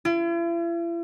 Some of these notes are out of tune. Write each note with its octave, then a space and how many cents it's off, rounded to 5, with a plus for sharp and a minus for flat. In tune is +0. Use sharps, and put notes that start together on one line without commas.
E4 +45